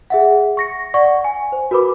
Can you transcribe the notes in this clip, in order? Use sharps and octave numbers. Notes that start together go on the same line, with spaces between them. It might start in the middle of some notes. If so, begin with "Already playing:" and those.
G#4 E5 F#5
C#6 A#6 C#7
D5 F#5 C#6
G#5
C5
F#4 A#4 B4 B5 D6